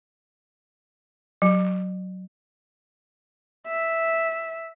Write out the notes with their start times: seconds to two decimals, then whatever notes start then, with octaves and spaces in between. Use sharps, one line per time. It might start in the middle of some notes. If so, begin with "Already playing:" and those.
1.42 F#3
3.67 E5